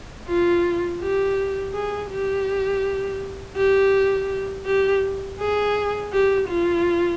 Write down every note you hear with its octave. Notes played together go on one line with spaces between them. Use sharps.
F4
G4
G#4
G4
G4
G4
G#4
G4
F4